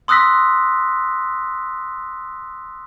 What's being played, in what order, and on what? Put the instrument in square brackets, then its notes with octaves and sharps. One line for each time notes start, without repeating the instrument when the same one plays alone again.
[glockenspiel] C6 D#6 E6 F#6 A#6 B6